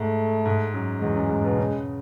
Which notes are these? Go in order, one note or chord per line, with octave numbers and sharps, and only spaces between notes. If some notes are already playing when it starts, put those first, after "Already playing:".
Already playing: G#2 A3
G#2
F#2
E2 G#3
F#2
G#2
B2
C#3